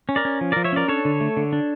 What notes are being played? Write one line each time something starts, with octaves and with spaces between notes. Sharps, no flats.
C#4
A#4 D5
C#4
F3
F3 A#4 D5
C#5 E5
C#4 A#4 D5
D4 A4 C#5
D3
A3
D3
D4